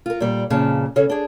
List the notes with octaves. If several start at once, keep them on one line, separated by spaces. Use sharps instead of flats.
F4 A#4
A#2 G3
F2 A#2 C#3 A5
C#3 C#4 A4
D4 G#4